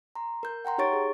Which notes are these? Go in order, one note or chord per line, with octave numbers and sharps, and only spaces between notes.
A#5 C6
A#4 G6
F#5 G5 A#5 C6
D#4 G4 C#5 C#6 A6 D7
G#4